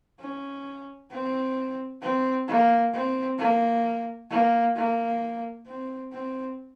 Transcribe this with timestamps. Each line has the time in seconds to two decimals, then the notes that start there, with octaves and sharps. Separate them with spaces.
0.20 C#4
1.12 C4
2.02 C4
2.48 A#3
2.93 C4
3.39 A#3
4.31 A#3
4.76 A#3
5.66 C4
6.12 C4